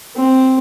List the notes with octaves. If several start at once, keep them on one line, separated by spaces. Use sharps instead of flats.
C4